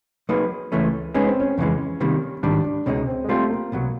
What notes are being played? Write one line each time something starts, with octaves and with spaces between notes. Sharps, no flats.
F#3 A#3 D#4 G#4 B4
C#2 C#3 E3 A3 C#4
G#3 B3 C#4 D#4 G#4
C4
C#4
F2 C#3 E3 G#3
C3 D#3 G3 A#3
G#2 D#3 G3 D4
D4
C#2 B2 G#3 C4 C#4 D#4
C4
G#3
G3 A3 C4 F4
A#3
C2 B2 F#3